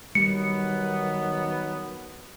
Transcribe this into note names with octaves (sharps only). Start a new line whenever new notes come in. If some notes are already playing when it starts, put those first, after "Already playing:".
D#3 F#3 G3 B3 C#7